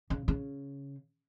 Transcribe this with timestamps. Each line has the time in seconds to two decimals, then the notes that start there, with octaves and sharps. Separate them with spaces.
0.10 C#3
0.28 C#3